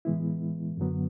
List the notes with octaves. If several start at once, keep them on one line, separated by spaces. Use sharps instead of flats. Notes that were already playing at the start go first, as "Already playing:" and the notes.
A2 E3 G#3 B3 E4
F#2 D3 F#3 B3